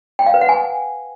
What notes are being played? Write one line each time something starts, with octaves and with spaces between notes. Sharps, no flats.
G5
F5
B4
F#5
G#5